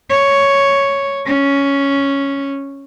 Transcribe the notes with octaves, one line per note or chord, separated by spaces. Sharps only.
C#5
C#4